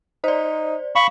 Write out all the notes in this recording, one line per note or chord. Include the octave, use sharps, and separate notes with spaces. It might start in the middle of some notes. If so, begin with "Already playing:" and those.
D#4 C5 D5
F5 B5 C#6